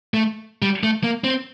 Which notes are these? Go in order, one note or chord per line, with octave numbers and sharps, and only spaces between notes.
A3
G3
A3
A#3
C4